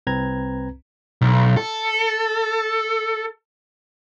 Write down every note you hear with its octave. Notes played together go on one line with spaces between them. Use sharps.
C2 C4 B4 A#5 G#6
B1
A4